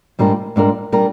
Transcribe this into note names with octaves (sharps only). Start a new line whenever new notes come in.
G#2 G3 D4 F4 A#4
G#2 G3 D4 F4 A#4
G3 D4 F4 A#4